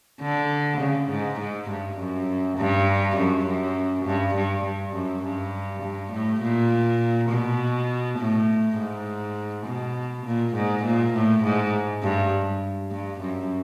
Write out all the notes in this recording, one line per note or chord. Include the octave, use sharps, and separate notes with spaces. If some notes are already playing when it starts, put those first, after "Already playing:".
D3
C#3
G#2
G#2
G2
F#2
G2
F#2
F#2
G2
G2
G2
F#2
G2
G2
A2
A#2
B2
A2
G#2
B2
A#2
G#2
A#2
A2
G#2
G2
G2
F#2